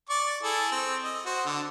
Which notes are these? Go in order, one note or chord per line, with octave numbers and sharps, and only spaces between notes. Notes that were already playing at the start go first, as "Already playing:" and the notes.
D5 C#6 D6
E4 G#4 A4
C4
D#5
F#4 C5
D3